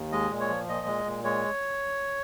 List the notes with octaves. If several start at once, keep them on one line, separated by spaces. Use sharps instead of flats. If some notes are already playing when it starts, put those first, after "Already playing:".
Already playing: D#2
G#3 D#5
A#2
C#5
F3
A#2 D#5
G#3
A#2
G#3 C#5